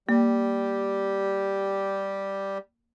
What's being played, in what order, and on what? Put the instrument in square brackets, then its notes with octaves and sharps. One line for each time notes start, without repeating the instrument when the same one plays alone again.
[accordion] G3 G4 [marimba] A#3